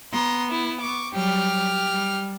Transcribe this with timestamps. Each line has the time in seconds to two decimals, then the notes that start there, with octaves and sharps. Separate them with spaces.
0.12 B3 A#5 C6
0.51 E4
0.80 C#6 D6
1.13 F#3 G3 G4 F6
1.90 G3